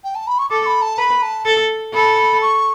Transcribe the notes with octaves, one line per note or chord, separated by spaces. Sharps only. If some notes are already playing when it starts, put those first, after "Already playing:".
G5
A5
B5
C#6
A4 D6
B5
A5
B4 B5
A5
A4
A4 B5
C#6